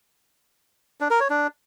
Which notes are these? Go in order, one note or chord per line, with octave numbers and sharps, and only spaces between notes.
D4
A#4
C#5
D4